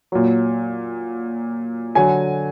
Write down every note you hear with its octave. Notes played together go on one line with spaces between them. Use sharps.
A#2 F#3
D3 F#3 G#5